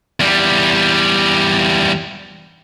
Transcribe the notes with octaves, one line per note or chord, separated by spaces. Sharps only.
E2 G3